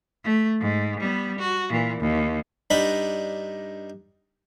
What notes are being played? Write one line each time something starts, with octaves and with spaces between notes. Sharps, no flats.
A3
G#2
G3 B3
F#4
A#2 E3
D#2
G2 D4 D#4 B5